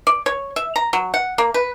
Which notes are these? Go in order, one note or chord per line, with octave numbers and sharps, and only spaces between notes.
D5
C#5
E5
A#5
F#3
F#5
A#3
B4